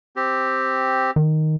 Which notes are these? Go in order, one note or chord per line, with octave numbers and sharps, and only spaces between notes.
C4 G4
D#3